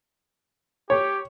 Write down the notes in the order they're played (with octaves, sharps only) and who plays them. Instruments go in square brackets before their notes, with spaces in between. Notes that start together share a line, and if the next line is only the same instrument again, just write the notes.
[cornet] G4 [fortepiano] C#5